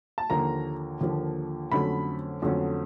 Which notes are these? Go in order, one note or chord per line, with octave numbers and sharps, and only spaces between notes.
A5
D#2 D3 F3 A#3 A#5
D#2 D3 F3 A#3
F2 D3 F#3 A3 C#4 B5
F2 D3 F#3 A3 C#4